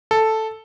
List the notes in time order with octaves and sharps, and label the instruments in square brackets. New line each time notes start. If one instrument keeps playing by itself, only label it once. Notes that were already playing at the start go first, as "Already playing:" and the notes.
[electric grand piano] A4